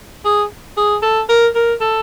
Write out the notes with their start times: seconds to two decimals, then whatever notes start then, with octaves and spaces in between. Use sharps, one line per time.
0.25 G#4
0.77 G#4
1.02 A4
1.29 A#4
1.55 A#4
1.81 A4